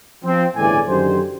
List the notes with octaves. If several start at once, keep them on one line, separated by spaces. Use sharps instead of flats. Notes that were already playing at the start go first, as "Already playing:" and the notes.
F3 C4
G1 A2 C#3 E3 D5 G#5
F#2 D3 D#3 G4 C5